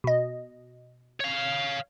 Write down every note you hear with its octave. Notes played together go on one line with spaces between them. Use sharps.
B2 D#5
C#5 F5